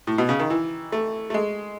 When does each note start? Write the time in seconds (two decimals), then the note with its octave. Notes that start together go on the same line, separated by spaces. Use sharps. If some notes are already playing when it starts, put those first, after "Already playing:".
0.07 A2
0.18 B2
0.29 C#3
0.39 D#3
0.50 E3
0.92 A3
1.30 A3
1.34 G#3